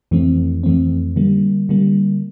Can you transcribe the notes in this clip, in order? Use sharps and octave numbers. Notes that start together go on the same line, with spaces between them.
F2 E3 A3 C4
F2 E3 A3 C4
D3 G3 A#3
D3 G3 A#3